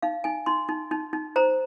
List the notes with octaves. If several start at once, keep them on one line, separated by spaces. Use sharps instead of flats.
D#4 F5
D#4 G#5
D#4 C6
D#4
D#4
D#4
C5 A#5